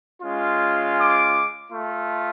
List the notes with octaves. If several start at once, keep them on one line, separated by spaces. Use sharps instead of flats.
G#3 C#4 F4
D6
A3 F4